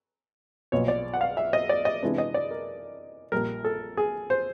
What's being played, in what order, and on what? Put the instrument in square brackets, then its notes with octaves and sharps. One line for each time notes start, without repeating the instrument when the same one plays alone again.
[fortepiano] B1 A#2 F3 C#5
D5
F#5
F5
E5
D#5
D5
D#5
C3 E3 G#3 B3 D4
D#5
D5
A#4
A#1 A#2 G3 A#4
A4
G#4
C5